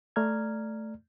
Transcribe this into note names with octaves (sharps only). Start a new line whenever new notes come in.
A3 D5 A#5 F6 G#6